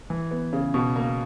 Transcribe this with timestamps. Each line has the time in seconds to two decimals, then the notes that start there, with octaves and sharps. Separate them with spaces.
0.10 E3
0.31 B3
0.53 C#3
0.74 B2
0.96 A#3